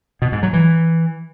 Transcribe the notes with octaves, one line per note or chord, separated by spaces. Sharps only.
B2
G#2
F#3
E3